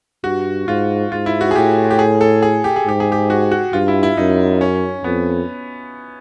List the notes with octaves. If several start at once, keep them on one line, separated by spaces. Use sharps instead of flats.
G2 F#4
G#2 F4
G#2 F4
E4
F#4
G#4
A2 G4
G4
G#4
A4
G#4
G4
G#4
G#2 G4
G#4
G4
F#4
F#4
G2 F4
E4
E4
F#2 D#4
C#4
F2 B3